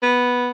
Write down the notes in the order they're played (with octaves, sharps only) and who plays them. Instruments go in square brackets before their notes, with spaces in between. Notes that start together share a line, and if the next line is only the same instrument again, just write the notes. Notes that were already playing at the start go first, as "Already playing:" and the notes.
[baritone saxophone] B3